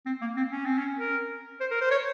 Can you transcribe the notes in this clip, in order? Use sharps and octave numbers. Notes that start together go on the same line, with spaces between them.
C4
A#3
C4
C#4
C4
C#4
A#4
C5
A#4
C5
C#5